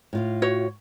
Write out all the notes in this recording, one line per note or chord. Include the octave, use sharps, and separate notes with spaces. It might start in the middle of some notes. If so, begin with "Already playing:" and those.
A2 F4 F5
F#4 C#5